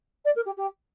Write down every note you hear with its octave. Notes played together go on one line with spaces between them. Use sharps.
D5
A#4
G4
G4